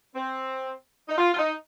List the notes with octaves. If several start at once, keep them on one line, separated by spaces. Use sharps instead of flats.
C4
D#4
F4
F4
D#4